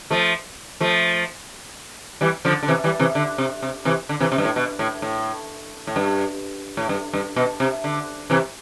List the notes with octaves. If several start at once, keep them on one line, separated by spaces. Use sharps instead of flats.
F3 A3
F3 A3
E3 G3
D3 F3
D3
C3 E3
E3 G3
C3 E3
D3
C3
C3
C3 E3
D3
C3 E3
C3
G2
A2
B2
A2
A2
A2
G2
A2
G2
G2
B2
C3
D3
C3 E3